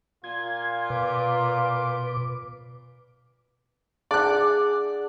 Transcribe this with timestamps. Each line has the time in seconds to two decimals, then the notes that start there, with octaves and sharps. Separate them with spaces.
0.24 A#2 F4 G#6
0.90 B2 B4 D6
4.11 D4 G#4 D5 F#5 F#6